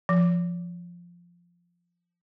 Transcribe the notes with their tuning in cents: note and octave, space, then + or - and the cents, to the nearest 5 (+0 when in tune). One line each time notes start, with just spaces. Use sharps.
F3 -5